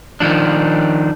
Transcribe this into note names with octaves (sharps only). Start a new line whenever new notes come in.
D#3 F3 D4